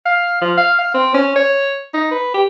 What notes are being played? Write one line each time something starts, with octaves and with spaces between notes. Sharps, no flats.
F5
F3
F5
F5
C4
C#4
C#5
D#4
B4
G4